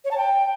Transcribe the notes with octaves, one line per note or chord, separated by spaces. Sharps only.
C#5
A5
G5